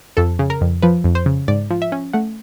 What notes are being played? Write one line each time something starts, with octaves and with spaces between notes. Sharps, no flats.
F2 A4
C#3
A#4
F2
F3 B4
F2
C5
C#3
G#2 D5
F3
E5
C#4
A3 F#5